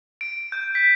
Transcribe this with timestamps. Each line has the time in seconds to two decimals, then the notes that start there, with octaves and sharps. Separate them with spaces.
0.21 D7
0.52 G6
0.75 B6